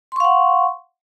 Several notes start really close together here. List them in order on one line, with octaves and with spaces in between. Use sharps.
C6 C#6 F5 F#5